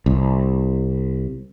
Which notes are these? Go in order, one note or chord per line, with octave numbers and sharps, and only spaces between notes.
C2